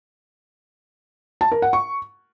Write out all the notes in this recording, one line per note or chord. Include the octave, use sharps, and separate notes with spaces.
A5
A#4
F#5
C#6